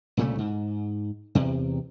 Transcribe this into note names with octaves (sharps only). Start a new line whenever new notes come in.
C2 A#2 C#3 A3
G#2
E2 C3